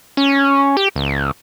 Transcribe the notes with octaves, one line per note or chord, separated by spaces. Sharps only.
C#4
G4
C#2